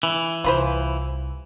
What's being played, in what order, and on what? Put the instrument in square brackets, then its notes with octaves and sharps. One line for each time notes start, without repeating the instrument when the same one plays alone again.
[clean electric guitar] E3
[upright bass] C2 [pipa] F4 B4 C5